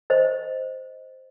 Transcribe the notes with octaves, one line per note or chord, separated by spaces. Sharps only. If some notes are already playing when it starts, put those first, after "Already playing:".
C5 D#5